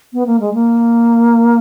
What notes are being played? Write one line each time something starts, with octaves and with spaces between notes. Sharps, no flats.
B3
A#3
G#3
A#3